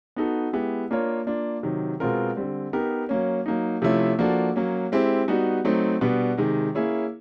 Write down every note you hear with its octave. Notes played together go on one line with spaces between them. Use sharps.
B3 D#4 F#4 A4
G#3 B3 E4 G4
A#3 D4 F4 A#4 C#5
A#3 D4 F4
C3 D#3 F#3
B2 G#3 C4 F4 A#4
D3 G3 C4
B3 D#4 G4 A#4
F#3 A#3 C#4
F#3 A#3 D#4
C3 F3 A3 C#4 E4
F3 A#3 D4 F#4 A4
F#3 A#3 C#4
G#3 C4 E4 G4
G3 B3 D#4 F#4
F#3 A3 C4 D#4
B2 G3 B3 D4
C3 D#3 G#3
A#3 C#4 E4 G#4 C#5